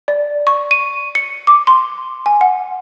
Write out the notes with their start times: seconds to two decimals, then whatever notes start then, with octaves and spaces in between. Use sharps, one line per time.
0.08 D5
0.47 C#6
0.71 D#7
1.15 C#7
1.47 D6
1.67 C6
2.26 G#5
2.41 F#5